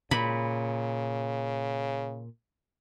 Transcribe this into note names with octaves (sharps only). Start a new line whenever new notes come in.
A#2 C#3 B5